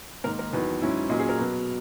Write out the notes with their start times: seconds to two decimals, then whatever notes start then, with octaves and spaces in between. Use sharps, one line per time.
0.24 G#2 D#3 A#3 D#4 A#4
0.39 A#4
0.53 E2 D#3 F#3 B4
0.81 G#2 F#3 C#4 E4
1.09 A#2 F#3 C#4 D#5
1.19 G#4
1.29 A#4
1.38 B2 F#3 B3